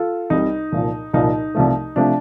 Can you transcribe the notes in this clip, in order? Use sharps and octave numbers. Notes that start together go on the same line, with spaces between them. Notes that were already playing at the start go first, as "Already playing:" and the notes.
Already playing: F4 A4
C2 C3 G3 D#4
C2 A#2 F3
C2 A#2 F3 D#4
C2 C3 F3 A3
C3 F3 A3 D4